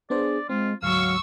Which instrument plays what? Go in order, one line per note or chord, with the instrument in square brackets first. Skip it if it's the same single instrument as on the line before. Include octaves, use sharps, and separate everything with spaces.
[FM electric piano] B3 D4 C5 [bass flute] G#4 [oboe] D5
[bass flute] G#3 [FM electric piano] C4 [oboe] F4
[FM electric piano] D2 G#2 [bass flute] F#3 [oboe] F5 [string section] C#6 E6